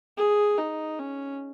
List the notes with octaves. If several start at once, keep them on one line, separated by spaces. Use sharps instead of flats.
G#4
D#4
C#4